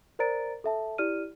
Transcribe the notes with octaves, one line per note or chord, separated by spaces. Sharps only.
A#4 C5 D5 A#5 A6 D7
A4 E5 A5
E4 G4 D5 F6 D#7